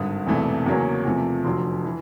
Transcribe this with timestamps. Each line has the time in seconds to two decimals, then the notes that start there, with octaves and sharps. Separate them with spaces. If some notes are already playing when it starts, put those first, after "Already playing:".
Already playing: G#1 G2 D3 D#6
0.27 E1 E2 C3 E3 A3
0.66 E2 C#3 F#3 A#3 C#4
1.05 E2 C3 F3 A3
1.44 F1 F2 D3 F#3 C6
1.84 E3